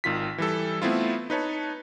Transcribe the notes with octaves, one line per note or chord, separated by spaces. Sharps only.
G#1 D#3 F4 B6
E3 G3 A4
A3 B3 C4 E4 F4
D#4 B4 C#5 A5